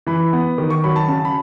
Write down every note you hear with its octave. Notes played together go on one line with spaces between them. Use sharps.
E3 B5
B3
D#3
C#6
F#3 B5
A5
C#3 A5
B5